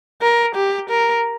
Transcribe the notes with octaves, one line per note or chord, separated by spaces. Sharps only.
A#4
G4
A#4